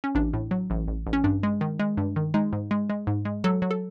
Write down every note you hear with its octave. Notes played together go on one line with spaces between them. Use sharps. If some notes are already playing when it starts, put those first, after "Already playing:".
C#4
A1 D4
A2
F#3
A1
A1
A1
C#4
G2 D4
G#3
D#3
G#3
G2
D#3
G#3 D#4
G#2
G#3
G#3
G#2
G#3
F#3 A4
F#3
A4